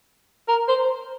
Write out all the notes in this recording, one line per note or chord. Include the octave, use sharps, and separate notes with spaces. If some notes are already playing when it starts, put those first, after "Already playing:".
A#4
C5